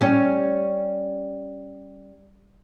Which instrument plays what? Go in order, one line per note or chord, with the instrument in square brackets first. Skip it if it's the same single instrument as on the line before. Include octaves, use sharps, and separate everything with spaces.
[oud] G3 C#4